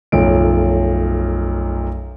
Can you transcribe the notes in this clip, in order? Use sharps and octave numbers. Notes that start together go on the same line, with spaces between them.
B1 F#2 F3 A3 D7